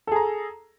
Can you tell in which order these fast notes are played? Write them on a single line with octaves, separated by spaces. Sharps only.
A4 G#4 A#5